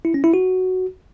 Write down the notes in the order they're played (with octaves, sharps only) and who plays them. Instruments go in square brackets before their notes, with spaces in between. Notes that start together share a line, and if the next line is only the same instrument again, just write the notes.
[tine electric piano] E4
C#4
E4
F#4